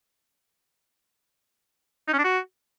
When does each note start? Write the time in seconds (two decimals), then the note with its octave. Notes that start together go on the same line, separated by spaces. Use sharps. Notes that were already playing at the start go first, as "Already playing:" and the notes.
2.08 D#4
2.13 C#4
2.19 D4
2.24 F#4